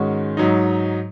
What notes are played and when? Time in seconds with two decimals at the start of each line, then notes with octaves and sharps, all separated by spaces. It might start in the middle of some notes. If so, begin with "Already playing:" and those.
Already playing: G#2 D#3 G#3 C#4 F#4
0.37 G#2 F#3 D#4